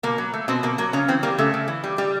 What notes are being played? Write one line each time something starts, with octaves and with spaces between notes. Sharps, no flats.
B2 A#3
F#3
A3
B2 C4
B2 A#3
F#3 A#3
C#3 C#4
E3 C4
G3 A#3
C#3 A3
C#3
E3
G3
G3